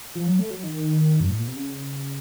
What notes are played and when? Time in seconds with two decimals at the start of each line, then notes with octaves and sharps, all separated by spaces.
0.15 F3
0.27 F#3
0.39 A3
0.51 F#3
0.63 D#3
1.20 F#2
1.29 A2
1.39 A#2
1.48 C3
1.56 C#3